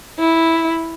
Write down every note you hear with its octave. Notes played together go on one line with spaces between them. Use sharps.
E4